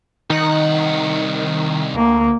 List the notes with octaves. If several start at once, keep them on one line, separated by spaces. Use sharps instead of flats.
C2 D#3 D#4 F#5
D2 A#3